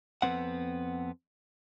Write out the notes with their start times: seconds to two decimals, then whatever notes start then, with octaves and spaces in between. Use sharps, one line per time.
0.22 F2 F3 B3 C4 F#5